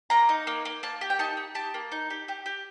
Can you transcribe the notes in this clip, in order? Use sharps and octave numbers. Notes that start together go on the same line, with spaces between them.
A#3 A#5
D#4
A#3
A#3
A#3 A5
G4
G5
D#4 A5
D#4
G4 A5
A#3
D#4
G4
G4
G4